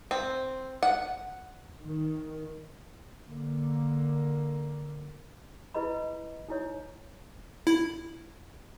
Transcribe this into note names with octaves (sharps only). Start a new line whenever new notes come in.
C4
F#5
D#3
D3 A#3
E4 B4 D#5 B5
D#4 E4 C#5
E4